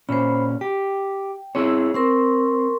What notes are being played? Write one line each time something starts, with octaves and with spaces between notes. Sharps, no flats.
A#2 C#4 C5 B5
G4 G5
C4 E4 G#4 C#5 E6
C4 A#4 C6 C#6